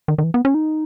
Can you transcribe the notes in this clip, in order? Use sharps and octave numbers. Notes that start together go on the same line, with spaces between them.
D#3
D#3
E3
B3
C#4
D#4